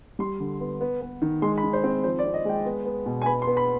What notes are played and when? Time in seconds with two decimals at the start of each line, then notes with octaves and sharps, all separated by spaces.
0.19 G3 C6
0.40 D3
0.60 B3
0.81 B3
1.01 B3
1.22 D#3
1.42 G#3 C6
1.58 B5
1.63 D#3
1.73 C5
1.84 C4
2.04 F3 C5
2.19 D5
2.24 C4
2.34 D#5
2.45 G#3 G5
2.65 B3
2.85 B3
3.06 B2
3.22 G#5
3.26 B3 B5
3.42 C6
3.47 B3
3.57 B5